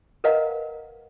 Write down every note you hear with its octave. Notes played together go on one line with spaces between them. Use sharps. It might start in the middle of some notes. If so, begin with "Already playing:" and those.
A#4 B4 D#5 F5 F#5 A#5